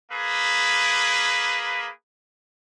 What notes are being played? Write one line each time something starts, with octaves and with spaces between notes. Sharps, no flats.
A#3 G#4 B4